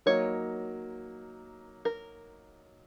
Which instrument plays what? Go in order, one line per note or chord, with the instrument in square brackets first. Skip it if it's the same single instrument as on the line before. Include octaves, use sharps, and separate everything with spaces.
[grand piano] F#3 A#3 D#4 [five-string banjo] C#5
[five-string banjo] A#4